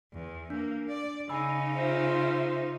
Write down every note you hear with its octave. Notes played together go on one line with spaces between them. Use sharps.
E2
A#3 D4
D5
C#3 D#4 G#5 B5 E6
F4 C5 E5